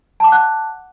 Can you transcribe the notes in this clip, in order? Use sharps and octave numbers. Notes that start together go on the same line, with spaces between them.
F#5 A5 D6 F#6